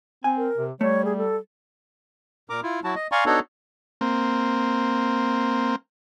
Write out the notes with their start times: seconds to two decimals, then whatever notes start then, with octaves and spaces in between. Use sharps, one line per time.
0.24 C4 G#5
0.37 A#4
0.58 C3
0.81 G3 A3 C#5
1.05 G#4
1.18 A4
2.50 A#2 A#4 A#5 D6
2.63 E4 F4
2.84 F#3 E4 F#4 A5
2.95 D#5
3.12 D5 F5 G#5 A#5 C6 C#6
3.26 B3 D4 D#4 F#4 A4 C#5
4.01 A#3 C4